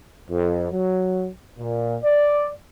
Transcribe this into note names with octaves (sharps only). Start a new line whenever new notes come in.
F2
F#3
A#2
D5